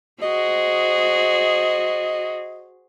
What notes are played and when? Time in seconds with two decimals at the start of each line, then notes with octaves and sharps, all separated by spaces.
0.22 F#4 G#4 C5 D#5